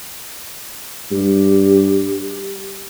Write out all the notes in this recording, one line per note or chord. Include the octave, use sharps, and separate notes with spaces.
G2 G4